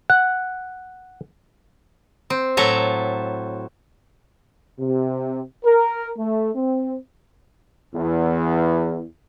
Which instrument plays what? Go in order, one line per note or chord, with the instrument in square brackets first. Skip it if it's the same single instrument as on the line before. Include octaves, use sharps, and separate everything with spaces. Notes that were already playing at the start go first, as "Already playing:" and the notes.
[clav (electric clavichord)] F#5
[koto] C4
A2 F#3 A4 E5 A#5
[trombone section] C3
A#4
A3
C4
E2